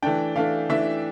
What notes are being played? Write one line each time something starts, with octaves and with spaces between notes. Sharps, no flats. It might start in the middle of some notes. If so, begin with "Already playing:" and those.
E3 A3 D4 G5
E3 A3 D4 F5
E3 A3 D4 E5